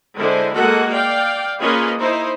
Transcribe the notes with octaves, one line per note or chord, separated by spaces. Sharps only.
D3 G#3 E4 C5
G#3 A#3 F#4 A4 F#5
D5 F5 G5
A#3 C#4 F4 G#4 B4 D#5
D#4 E4 C5